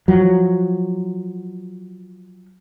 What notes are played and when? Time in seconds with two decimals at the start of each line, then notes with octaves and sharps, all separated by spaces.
0.08 F3 F#3